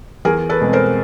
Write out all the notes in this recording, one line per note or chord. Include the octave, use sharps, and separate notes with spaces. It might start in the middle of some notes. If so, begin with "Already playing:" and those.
E2 G#4 A#4
A4 B4
B2 G#3 C4
A#4 C5